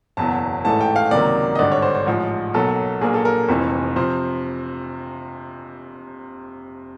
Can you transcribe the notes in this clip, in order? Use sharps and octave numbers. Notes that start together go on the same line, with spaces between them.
F#1 E2 B2 F#3 A5
A1 G#2 E3 A3 A5
G5
F5
C#2 C3 D#3 F#3 A#3 D5
D#5
G#1 G2 D3 D5
C#5
C5
C5
A1 G#2 F3
B1 B2 F#3 A#3 A4
A#1 A#2 F#3 A#3 G#4
A4
A#4
F1 F2 C3 E3
C3 F3 C5